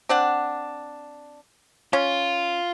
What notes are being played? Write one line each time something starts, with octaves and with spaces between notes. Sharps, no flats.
C4 D4 F#5
C#4 F4